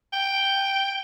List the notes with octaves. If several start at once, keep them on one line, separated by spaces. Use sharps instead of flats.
G5